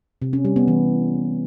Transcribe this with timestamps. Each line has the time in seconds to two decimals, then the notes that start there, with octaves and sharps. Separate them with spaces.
0.22 C3
0.33 C#4
0.45 G3
0.56 B3
0.68 E3